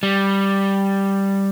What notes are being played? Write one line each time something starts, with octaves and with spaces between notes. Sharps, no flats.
G3